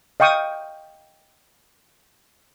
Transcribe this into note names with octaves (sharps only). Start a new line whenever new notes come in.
D#5 F5 G5 C#6 D#6